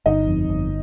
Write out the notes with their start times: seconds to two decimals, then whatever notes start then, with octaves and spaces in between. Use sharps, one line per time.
0.06 G1 D#4 D#5
0.27 F2
0.49 G1